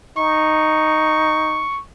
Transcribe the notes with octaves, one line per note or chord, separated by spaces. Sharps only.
D#4 C#6